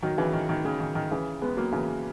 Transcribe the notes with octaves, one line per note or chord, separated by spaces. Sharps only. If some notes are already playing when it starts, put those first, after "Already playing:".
D#3 F#3
C#3 E3
D#3
D#3
C#3
D#3
D#3
C#3 E3
G#3 B3
F#3 A#3
C#3 E3